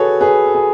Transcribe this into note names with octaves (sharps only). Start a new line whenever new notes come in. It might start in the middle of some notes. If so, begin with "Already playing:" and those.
Already playing: F#4 G#4 A4 B4 C#5
G#4 B4
A4
G#4